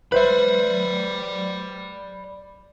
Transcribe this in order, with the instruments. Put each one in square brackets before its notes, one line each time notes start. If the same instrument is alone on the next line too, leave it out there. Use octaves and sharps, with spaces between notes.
[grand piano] B4 C5 E5 [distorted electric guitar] D5 B5